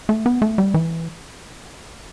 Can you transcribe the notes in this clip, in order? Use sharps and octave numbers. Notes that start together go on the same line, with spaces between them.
A3
B3
A3
G3
E3